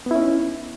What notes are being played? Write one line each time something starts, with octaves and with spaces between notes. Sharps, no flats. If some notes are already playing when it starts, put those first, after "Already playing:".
B3 C#4 D#4 E4